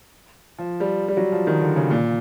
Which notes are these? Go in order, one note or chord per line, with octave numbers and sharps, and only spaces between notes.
F3
G3
G3
F#3
F3
D#3
D3
C#3
A#2